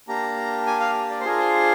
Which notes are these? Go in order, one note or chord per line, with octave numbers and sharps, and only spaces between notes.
A#3 D4 G4 A#5
G#5
F5
D5
C5
D4 F4 G#4 A#4
C5